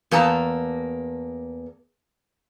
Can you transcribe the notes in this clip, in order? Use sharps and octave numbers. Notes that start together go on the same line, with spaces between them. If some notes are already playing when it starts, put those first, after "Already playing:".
E2 A#3 A5 A#5